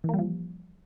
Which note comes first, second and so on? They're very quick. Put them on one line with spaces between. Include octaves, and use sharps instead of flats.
E3 A#3 G3 F3